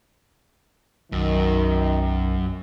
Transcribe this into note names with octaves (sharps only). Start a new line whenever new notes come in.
B1 F#2 D#3